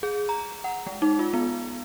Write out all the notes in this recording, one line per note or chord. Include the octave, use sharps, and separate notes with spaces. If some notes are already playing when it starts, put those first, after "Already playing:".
G#4
A#5
F#5
G#3
D#4
F4
B3